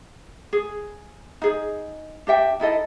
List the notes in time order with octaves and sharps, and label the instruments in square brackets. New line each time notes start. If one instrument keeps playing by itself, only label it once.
[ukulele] G#4
D#4 G#4
D4 G4 E5 G5
D#4 E4 A4 D#5